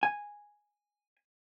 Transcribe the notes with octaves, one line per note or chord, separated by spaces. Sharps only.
G#5